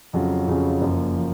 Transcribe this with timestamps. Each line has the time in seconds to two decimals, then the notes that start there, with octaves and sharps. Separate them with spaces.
0.13 F2 C#3 F#3 C#4 F4
0.48 F2 C#3 F#3 C#4 F4
0.81 F#1 F#2 F3 A#3
1.17 F3